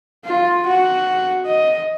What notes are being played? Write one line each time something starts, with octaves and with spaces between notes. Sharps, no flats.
F4
F#4
D#5